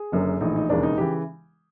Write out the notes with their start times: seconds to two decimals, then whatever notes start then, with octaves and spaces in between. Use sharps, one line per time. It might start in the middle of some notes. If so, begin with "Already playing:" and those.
Already playing: G#4
0.12 F#1 F#2 D3
0.41 A#1 A2 E3 D#4
0.56 D#4
0.69 E1 D#2 C#3 E3 D4
0.83 D#4
0.98 C#3 E3 G4